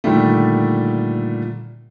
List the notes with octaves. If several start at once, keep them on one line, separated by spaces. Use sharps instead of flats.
A#2 D3 D#3 G3 A3